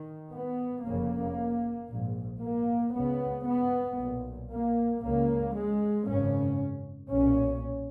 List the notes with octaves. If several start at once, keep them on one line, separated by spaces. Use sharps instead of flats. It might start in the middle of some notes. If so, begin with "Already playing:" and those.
Already playing: D#3
B3
F1 F2 C#3 A#3
A#1 G#2
A#3
C#2 C#3 B3
B3
B1
A#2
A#3
C#2 C#3 A#3
G#3
G#1 F#2 C#3 C#4
B1 A#2 C#4